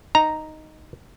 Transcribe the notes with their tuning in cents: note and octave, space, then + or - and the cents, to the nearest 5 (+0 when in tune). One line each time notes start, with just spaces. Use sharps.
D#4 +0 A#5 +0